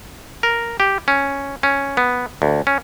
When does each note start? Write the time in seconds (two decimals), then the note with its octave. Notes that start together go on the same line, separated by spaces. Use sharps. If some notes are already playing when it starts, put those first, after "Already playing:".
0.43 A#4
0.80 G4
1.08 C#4
1.63 C#4
1.97 B3
2.42 D2
2.67 C#4